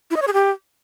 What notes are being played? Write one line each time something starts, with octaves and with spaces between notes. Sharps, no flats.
E4
D#5
C#5
G#4
G4